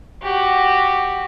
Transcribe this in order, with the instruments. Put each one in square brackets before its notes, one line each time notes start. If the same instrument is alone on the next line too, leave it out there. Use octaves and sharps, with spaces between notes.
[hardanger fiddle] F#4 G4